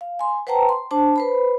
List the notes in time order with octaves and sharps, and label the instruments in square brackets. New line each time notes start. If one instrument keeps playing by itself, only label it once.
[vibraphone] F5
G#5 C6
B4 C5 F#5 G5 A5 A#5
C6
D4 C5 A5
B4 C5 B5